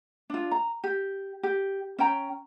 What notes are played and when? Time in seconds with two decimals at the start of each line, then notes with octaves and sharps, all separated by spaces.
0.30 D4 F4
0.51 A#5
0.84 G4
1.43 G4
1.98 C#4 C#5 G5 A#5